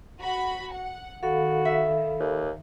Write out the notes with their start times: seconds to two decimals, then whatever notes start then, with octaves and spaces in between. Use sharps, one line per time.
0.20 F#4 B5
0.73 F#5
1.23 D#3 F#4 A4 F5 B5
1.65 E5
2.20 D#2